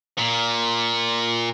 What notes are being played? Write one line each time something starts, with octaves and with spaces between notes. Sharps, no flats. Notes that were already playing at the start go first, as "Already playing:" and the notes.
A#2